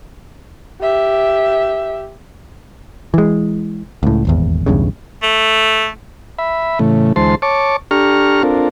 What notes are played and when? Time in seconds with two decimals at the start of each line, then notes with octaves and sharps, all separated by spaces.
0.82 G4 E5
3.14 E3 G#3
4.03 C#2 A2
4.25 D#1 G#1 E2
4.66 B1 E2 G2 C#3
5.23 A3
6.39 E5 B5
6.79 A2 C#3 E3 A3
7.16 D2 E3 G#3 C5 A5 C6
7.42 C#5 A5 C#6 D6
7.91 D4 G4 A4 A#5 C#6 F6
8.43 C4 D4 F4 A4 A#4